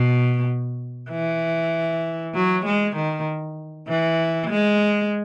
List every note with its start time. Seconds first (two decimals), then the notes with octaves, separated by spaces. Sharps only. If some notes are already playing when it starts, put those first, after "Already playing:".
Already playing: B2
1.10 E3
2.34 F#3
2.65 G#3
2.96 D#3
3.88 E3
4.50 G#3